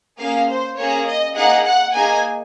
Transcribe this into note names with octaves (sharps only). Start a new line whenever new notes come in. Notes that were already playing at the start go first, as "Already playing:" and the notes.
A#3 C#4 G#4 F5
C5
A#3 C#4 G#4 C#5
D#5
A#3 D#4 G#4 F#5
F#5
A#3 D#4 G#4 G#5